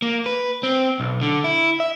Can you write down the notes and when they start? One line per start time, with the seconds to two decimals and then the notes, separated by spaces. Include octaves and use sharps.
0.02 A#3
0.26 B4
0.63 C4
1.00 B1
1.21 D3
1.44 E4
1.80 E5